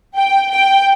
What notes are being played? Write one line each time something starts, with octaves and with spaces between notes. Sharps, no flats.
G5
G5